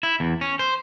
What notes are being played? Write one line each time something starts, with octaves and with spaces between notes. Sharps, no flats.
E4
E2
C#4
C5